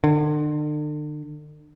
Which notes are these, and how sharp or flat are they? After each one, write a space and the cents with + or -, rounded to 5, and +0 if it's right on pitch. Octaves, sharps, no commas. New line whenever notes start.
D3 +40